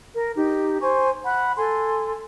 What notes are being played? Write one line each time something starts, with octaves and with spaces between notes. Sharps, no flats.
A#4
D#4 G4
C5 G#5 C#6
F#5 B5
A4 G#5 C6